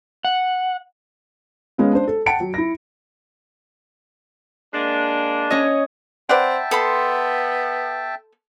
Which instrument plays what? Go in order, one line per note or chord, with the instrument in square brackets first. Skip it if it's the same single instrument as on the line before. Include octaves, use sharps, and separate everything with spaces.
[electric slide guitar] F#5
[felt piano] G#3 B3 C#4 F5
D4 C5
A4
F#5 G5 A5 C#7 D7
F#3
E4 A#6
[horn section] G#3 A#3 D4
[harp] C#4 C#5 D#5
[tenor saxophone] C4 [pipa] B4 D5 F#5 [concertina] E5 G5 A5
[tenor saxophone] B3 [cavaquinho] A4 B5 C6